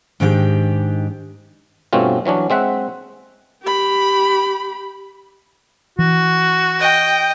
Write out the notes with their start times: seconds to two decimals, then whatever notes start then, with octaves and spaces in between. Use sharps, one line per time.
0.20 G#2 D#3 D4 E4 G4 G5
1.93 G2 B2 A3 C4 C#4 F4
2.26 E3 F#3 C#4 D4
2.50 G#3 C4 E5 F#5
3.62 G4 B5
5.99 E3 F#4
6.80 D#5 G5